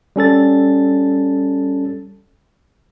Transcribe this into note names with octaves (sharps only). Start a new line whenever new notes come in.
G3 C#4 A4 A6